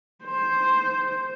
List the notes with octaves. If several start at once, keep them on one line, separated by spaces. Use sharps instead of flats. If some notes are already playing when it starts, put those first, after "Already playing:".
C5